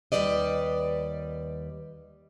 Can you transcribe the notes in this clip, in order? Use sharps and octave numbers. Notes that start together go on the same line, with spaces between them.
D#2 A#2 G3 B4 D5 D#5